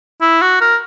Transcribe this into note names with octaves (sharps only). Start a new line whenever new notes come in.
E4
F#4
A#4